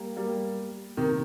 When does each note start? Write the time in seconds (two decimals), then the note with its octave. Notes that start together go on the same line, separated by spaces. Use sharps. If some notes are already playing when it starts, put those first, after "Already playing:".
Already playing: G3 A#3
0.16 G3 A#3
0.97 C3 D#3